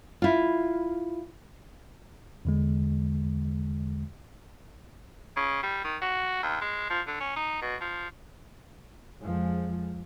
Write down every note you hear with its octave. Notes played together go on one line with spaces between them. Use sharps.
E4 F4
E2 D3 G#3
C#3
G3
D#3
F#4
D#2
G#3
F3
D3
C#4
D#4
B2
F3
F2 F3 G#3